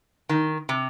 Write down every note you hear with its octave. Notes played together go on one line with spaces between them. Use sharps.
D#3
C3